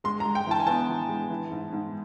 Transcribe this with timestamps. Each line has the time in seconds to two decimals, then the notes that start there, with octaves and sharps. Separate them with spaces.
0.04 G#3 C6
0.20 A#5
0.25 G#3
0.35 G5
0.47 E3 A5
0.60 G#5
0.67 B3 A5
0.89 E3
1.09 G#3
1.30 E3
1.51 G#2
1.72 G#2